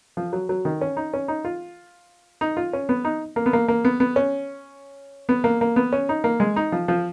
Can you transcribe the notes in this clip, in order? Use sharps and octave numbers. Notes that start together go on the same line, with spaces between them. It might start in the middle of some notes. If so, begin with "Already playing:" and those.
F3
F#3
F#3
D#3
C#4
D#4
C#4
D#4
F4
D#4
F4
C#4
B3
D#4
A#3
B3
A#3
A#3
B3
B3
C#4
B3
A#3
A#3
B3
C#4
D#4
A#3
G#3
D#4
F3
F3